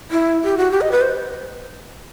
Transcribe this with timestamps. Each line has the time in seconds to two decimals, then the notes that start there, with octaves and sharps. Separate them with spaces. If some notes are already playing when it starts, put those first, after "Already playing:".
0.11 E4
0.44 G4
0.58 F#4
0.71 G4
0.81 D#5
0.92 B4
1.01 C5